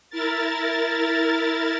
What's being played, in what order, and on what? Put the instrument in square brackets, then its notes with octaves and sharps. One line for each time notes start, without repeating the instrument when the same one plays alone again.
[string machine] E4 A#4 A6